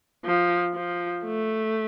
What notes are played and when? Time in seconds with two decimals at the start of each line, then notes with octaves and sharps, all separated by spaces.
0.25 F3
0.74 F3
1.24 A3